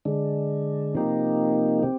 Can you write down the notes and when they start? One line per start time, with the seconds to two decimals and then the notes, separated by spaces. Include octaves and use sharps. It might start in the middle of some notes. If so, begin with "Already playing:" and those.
0.05 D3 G#3 D4
0.94 C3 F3 A#3 D#4 G4
1.83 C4 G4